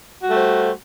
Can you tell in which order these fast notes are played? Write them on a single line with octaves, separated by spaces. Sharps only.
F#4 G3 A3 C5